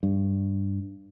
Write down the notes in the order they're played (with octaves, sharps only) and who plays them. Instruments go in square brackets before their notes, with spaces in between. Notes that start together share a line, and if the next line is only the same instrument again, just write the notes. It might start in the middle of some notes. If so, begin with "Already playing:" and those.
[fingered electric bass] G2